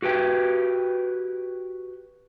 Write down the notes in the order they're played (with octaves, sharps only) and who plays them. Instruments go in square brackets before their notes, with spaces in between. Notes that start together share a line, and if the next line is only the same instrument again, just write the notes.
[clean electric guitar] F#4 G4 B4 G5